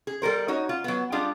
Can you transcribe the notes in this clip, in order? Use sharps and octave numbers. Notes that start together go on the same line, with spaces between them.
G#4
G3 A4 A#4 C5
D#4 F#4 C#5
F4
F#3 B3
G3 D4 F4 G4 G#4